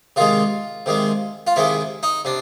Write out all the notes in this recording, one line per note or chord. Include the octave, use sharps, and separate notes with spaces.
C3 D#3 G#3 F4
C3 D#3 G#3
F4
C3 D#3 G#3 E4
D#4
C3 D4